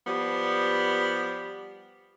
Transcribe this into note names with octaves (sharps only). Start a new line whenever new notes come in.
F3 G3 B3